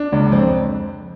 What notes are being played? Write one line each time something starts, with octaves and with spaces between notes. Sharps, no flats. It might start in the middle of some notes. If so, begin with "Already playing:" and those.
Already playing: D4
C#2
F2 C4